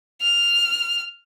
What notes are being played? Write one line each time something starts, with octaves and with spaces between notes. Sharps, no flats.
F6